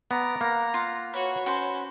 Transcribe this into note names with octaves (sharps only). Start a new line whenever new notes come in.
B3 D5 A#5
A#3 F#5
F4 F#5
F#4 B4 C#5
C#4 F#4 B4 C5